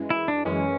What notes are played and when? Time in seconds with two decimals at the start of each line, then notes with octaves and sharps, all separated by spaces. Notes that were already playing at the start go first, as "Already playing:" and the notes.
Already playing: F#2 E3 G#3
0.10 E4
0.28 D4
0.45 F#2 E3 G#3 C#4